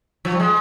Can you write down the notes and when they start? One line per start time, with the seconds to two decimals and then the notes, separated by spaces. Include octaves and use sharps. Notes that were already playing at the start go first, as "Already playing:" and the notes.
0.25 F3
0.32 G3
0.40 G#3